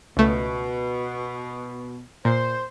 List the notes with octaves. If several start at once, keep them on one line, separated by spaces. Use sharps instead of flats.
C#2 B2 A3
A#2 C5